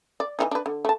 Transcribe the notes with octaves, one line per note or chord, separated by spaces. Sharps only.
D5
E3 C#4 D#4
D4 B4
D3
A3 A5